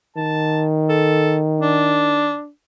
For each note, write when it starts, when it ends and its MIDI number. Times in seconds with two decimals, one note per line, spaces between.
0.17 2.38 51
0.17 0.65 81
0.89 1.39 69
1.61 2.49 62